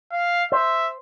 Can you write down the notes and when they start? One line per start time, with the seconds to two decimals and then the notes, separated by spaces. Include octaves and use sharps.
0.12 F5
0.52 C5 E5